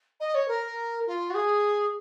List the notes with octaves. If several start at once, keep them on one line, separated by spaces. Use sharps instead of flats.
D#5
C#5
A#4
F4
F#4
G#4